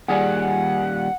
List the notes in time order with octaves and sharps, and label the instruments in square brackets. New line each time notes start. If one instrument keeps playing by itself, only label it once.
[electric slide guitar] A#2 D#3 G3 [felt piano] G#4 D5 G#5 [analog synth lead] F#5